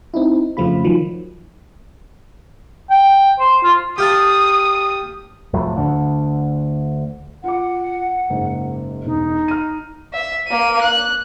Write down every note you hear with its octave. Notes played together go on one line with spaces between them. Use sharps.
C4 D#4 E4
F2 C#3 F3 A3 F4 B5
D#3 F3 F#3
G5
C5
F4
G4 F5 A5 D#6
F1 F2 A2 F#3
D2 D3
F4 F#5 D6
F#1 G#2
E1 D#4
F6 D#7
E5
A#3 D#7
F#6